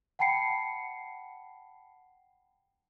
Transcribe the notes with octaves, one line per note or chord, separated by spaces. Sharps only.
F#5 G5 A5 B5 C7 C#7